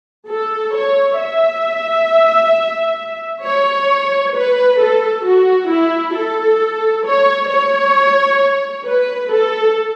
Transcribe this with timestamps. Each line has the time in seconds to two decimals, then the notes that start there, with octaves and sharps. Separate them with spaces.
0.29 A4
0.74 C#5
1.19 E5
3.44 C#5
4.34 B4
4.80 A4
5.25 F#4
5.70 E4
6.15 A4
7.05 C#5
7.50 C#5
8.86 B4
9.31 A4